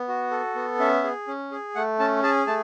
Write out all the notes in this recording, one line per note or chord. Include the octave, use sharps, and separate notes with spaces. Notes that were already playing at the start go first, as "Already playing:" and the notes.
Already playing: B3
F#4
A4
B3
C#4 E5
G#4
C#4
G#4
A3 F#5
C#4 A5
G#4 A5
A3 A5